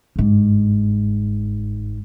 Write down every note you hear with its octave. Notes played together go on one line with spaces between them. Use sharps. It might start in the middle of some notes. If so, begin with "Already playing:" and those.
G1 G#2